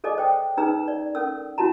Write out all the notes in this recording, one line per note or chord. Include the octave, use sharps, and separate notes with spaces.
G#4 A4 D5 D#5 G#5 D6
C5 G5 D#6
C#4 D#4 G#4 B4 A#5 E6
D5
C#4 A4 A#4 E6
C#4 E4 F#4 A5 A#5